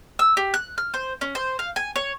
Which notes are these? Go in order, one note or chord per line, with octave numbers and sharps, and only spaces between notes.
E6
G4
F#6
F6
C5
C#4
C5
F5
G#5
C#5